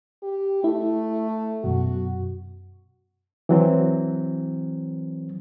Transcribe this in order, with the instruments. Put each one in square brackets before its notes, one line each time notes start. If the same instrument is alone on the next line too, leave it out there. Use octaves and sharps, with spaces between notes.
[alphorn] G4
[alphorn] A3 [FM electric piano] E4
[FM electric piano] F#2 B2 [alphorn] F#4
[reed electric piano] E3 F#3 C4